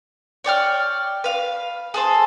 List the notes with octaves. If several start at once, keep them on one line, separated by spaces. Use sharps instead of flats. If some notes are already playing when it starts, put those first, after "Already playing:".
C#5 D5 G5 F6
B4 F5
G#4 A4 C5